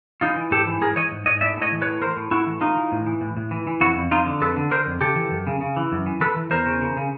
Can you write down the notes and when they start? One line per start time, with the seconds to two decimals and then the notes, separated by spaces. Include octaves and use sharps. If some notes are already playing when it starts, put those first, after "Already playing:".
0.21 E3 D#4 F4
0.36 E3
0.51 G#2 G4 A4
0.67 E3
0.81 G#2 G#4 A#4
0.96 E3 C#5 D#5
1.12 G#2
1.26 G#2 C#5 D#5
1.41 A2 D5 E5
1.57 A2 C#5 D#5
1.72 E3
1.82 B4 C#5
1.86 A2
2.01 A2 A#4 C5
2.17 A2
2.31 A2 E4 F#4
2.47 E3
2.61 A2 D#4 F4
2.77 E3
2.92 A2
3.06 E3
3.21 A2
3.37 A2
3.51 E3
3.67 E3
3.81 F2 E4 F#4
3.96 F2
4.11 F2 D#4 F4
4.26 D3
4.41 F2 A4 B4
4.56 D3
4.71 D3 A#4 C5
4.86 F2
5.01 C#3 G4 A4
5.16 E3
5.31 F#2
5.47 C#3
5.61 C#3
5.77 E3
5.92 F#2
6.06 E3
6.21 E3 A4 B4
6.36 E3
6.51 E2 A#4 C5
6.66 C#3
6.82 C#3
6.97 C#3